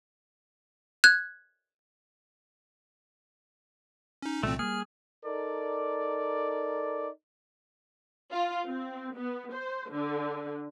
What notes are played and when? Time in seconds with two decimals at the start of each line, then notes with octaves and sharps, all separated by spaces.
1.04 F#6 G#6
4.22 C#4 D#4
4.43 C2 A#2 E3 A3 C4
4.59 G3 A#3 G#4 F6
5.25 D#4 A4 A#4 D5
8.32 F4
8.66 C4
9.16 B3
9.53 C5
9.92 D3